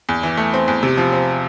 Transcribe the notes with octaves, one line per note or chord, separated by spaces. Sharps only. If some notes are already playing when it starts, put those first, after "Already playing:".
E2
E3
A3
C4
E2
C3
F3
C4